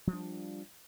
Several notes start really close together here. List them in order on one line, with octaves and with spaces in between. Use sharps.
F3 G3 D4